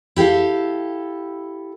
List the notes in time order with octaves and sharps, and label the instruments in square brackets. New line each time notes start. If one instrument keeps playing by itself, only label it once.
[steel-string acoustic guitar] E4 G4 A4 F5